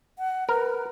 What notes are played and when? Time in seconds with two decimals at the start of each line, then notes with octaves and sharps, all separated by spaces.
0.19 F#5
0.49 A#4 B4